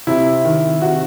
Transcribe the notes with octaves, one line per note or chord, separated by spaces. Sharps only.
C3 E4
D#3
C3 F#4